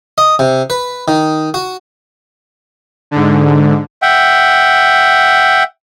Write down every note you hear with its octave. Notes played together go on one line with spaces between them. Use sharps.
D#5
C3
B4
D#3
F#4
G#2 D3
E5 F#5 G5